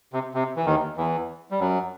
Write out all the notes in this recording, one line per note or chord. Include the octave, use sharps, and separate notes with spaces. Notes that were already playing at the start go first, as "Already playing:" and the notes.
C3
C3
E3
D#2 D#3
E2 E3
G3
F#2 F#3